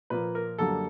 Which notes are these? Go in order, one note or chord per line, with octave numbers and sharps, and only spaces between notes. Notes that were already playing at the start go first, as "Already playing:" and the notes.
A#2 F3 A#3 B4
A#4
F#2 D3 G3 A#3 A4